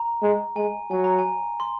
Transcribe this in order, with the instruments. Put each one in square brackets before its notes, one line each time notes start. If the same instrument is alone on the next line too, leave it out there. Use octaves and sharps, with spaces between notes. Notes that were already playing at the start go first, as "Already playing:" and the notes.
Already playing: [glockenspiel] A#5
[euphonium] G#3
[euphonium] G#3 [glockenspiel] G#5
[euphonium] F#3 [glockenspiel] G#5
[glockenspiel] A#5
G#5
C6